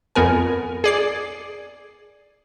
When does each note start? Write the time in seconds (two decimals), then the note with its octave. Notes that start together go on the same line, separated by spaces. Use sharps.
0.15 F2 B3 A#4 G#5
0.84 G#4 D5 C7